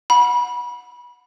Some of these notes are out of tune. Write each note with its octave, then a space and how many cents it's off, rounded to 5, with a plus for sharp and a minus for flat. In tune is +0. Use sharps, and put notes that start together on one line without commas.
F#5 -20 B5 -25